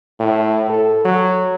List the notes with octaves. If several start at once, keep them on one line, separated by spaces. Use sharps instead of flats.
A2
A4
F#3